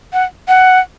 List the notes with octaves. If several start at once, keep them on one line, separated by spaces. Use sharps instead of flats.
F#5
F#5